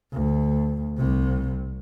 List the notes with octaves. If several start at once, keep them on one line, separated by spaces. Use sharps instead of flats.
D2
C2 C3